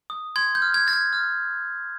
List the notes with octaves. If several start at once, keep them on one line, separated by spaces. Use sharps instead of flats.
D#6
C6 G#6
G6
F6
G#6
F6 A6
G#6
F6